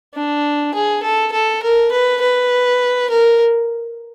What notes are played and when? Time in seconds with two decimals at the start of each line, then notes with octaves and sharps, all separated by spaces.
0.14 D4
0.74 G#4
1.02 A4
1.32 A4
1.62 A#4
1.92 B4
2.21 B4
3.10 A#4